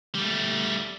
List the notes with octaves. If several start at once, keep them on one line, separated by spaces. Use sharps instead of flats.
G3 A3